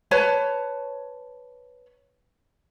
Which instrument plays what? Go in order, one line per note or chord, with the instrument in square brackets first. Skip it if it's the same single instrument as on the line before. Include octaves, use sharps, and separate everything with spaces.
[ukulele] B4 C#5 A5